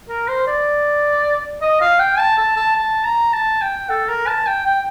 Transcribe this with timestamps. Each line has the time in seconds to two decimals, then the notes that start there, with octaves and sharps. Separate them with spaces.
0.09 A#4
0.28 C5
0.47 D5
1.62 D#5
1.81 F5
1.99 G5
2.19 A5
2.38 A5
2.56 A5
2.76 A5
3.04 A#5
3.33 A5
3.62 G5
3.90 A4
4.09 A#4
4.27 A5
4.47 G5
4.66 G5